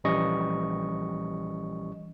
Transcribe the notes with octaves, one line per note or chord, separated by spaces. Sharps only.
A#1 E3 G3 C#4 D#5 C#6